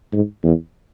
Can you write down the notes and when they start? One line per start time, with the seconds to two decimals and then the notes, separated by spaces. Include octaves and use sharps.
0.13 G#2
0.43 E2